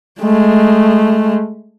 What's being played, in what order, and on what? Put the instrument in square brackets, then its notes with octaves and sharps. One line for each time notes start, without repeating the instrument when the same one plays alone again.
[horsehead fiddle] G#3 A3